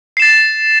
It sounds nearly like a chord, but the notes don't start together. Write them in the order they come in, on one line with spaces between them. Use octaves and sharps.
C7 E7 A6